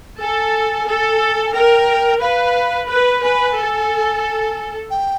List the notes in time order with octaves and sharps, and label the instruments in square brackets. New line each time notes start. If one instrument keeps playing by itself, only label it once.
[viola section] A4 [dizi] G#5
[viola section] A4
[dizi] G#5
[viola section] A#4 [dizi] G5
[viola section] B4 [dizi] F5
[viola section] B4
[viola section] B4 [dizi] G#5
[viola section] A4
[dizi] G5